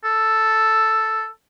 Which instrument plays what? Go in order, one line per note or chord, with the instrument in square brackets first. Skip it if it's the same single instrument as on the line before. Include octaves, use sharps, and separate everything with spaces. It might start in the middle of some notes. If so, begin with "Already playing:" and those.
[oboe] A4